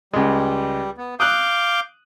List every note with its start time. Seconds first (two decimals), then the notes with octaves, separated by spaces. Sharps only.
0.13 C#2 G3 G#3
0.98 B3
1.20 F5 D6 D#6 F#6 G6